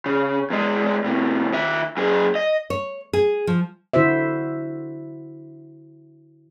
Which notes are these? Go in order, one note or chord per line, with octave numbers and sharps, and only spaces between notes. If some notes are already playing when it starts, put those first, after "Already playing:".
C#3
E2 G#3
A2 C3
D#3 E5
F#2 G#4
D#5
C#5
G#4
F3
D3 E4 F#4 C5 E5